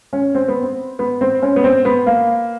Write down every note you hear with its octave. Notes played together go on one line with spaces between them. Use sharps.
C#4
C4
B3
C4
B3
C4
C#4
B3
C4
B3
A#3